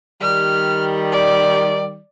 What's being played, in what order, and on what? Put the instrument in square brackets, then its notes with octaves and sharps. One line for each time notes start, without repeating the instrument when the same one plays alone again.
[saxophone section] D#3 G3 [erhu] F6
[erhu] D5